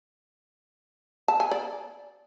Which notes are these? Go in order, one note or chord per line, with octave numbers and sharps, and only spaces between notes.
A5
G#5
D5